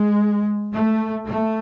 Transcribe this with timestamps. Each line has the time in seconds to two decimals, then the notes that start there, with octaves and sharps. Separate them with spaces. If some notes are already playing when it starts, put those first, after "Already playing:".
Already playing: G#3
0.74 A3
1.26 A3